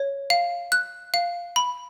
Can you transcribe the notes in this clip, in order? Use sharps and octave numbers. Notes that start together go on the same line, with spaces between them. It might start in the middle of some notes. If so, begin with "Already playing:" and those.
Already playing: C#5
F5
F#6
F5
B5